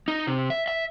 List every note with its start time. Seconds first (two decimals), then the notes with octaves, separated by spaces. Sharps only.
0.08 D#4
0.27 C3
0.50 E5
0.68 E5